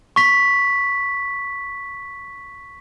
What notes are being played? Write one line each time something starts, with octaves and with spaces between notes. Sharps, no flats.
C#6 B6